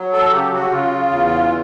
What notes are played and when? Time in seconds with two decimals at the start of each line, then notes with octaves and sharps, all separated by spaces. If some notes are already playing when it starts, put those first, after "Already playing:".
Already playing: F#3
0.13 A4
0.32 C#3 G4
0.52 F#4
0.71 C#3 F4
1.10 E2